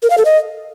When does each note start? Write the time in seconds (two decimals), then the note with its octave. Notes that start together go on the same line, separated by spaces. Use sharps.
0.03 A#4
0.10 F5
0.18 A4
0.25 D#5